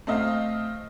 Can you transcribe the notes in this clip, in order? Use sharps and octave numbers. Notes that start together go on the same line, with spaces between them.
A3 C4 D#5 F5